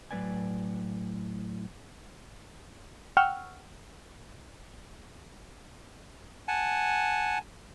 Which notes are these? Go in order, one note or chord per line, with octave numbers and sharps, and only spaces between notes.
A2 F#3 B3 B4 D5 G#5
F#5 G5 C#6 E6 F6 G6
F#5 G#5 A5